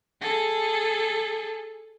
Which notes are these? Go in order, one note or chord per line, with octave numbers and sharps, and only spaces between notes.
G#4 A4